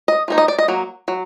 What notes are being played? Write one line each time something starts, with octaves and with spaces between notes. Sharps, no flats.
D#5
F3 A#3 D#4
D#5
D5
D#5
F#3 A#3
F#3